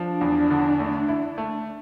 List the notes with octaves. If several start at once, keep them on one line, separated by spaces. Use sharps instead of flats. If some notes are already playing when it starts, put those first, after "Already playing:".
Already playing: F3 D4
E2
D3
A3
E4
A3